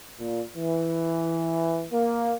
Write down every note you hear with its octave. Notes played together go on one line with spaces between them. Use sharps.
A#2
E3
A#3